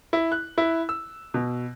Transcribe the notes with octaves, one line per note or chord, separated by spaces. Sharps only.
E4
F#6
E4
E6
B2